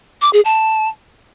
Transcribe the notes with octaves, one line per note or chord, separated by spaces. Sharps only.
D6
G#4
A5